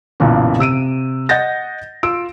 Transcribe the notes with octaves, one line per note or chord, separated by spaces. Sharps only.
B1 F#2 A#2 C#3 E3
C3 E6 D7 D#7
D#5 F#5 G6 A6 A#6
F4 E6 D7